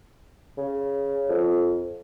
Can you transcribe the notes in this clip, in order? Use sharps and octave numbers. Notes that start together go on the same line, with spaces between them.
C#3
F2